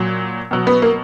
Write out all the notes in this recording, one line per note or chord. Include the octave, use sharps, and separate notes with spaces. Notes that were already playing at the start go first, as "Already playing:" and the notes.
Already playing: A#2 F#3
B2 F#3
B3
A#3